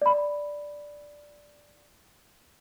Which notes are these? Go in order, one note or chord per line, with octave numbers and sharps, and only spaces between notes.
D5 B5